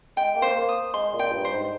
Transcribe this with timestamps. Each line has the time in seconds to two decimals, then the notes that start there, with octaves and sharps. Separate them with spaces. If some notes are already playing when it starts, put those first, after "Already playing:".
0.17 G#3 G5
0.35 A#3
0.42 C5
0.55 A#3
0.69 D#6
0.93 G#3 C6
1.14 A#2
1.19 G5
1.32 G2
1.45 C5
1.52 G#2